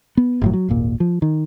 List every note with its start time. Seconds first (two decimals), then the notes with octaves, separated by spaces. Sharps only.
0.17 B3
0.41 G1 A2 F#3
0.53 F#3
0.68 D#1 G#1 A#2
1.00 F3
1.22 D#3